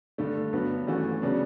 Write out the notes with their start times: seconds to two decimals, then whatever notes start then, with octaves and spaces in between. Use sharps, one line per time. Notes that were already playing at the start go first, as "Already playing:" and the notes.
0.18 G2 D3 A3
0.53 G2 F#3 B3
0.87 E3 A3 C#4 F#4
1.22 C#3 F#3 B3 D4